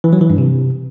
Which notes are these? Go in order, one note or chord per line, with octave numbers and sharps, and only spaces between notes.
E3
F#3
E3
G2
C3